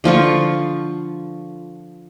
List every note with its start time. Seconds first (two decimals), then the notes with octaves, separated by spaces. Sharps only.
0.04 D3 F3 F4 C#6